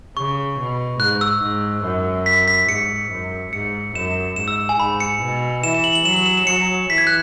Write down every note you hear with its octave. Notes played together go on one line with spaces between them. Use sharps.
C#3 C#6
B2
G#2 F#6
E6
G#2
F#2
B6
B6
G#2 C#7
F#2
G#2 C#7
F#2 E7
G#2 E7
E6
G#5
G#2 B5
C#7
B2
E3 E7
E7
F#7
F#7
F#3 E7
F#7
E7
E7
F#3 C#7
E3 B6
G#6
F#6